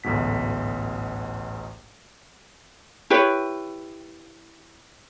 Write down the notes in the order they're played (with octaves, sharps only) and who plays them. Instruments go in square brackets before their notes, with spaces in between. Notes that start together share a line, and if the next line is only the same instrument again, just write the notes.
[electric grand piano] A1 D2 G#2 B2 B6
[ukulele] E4 G4 B4 C#5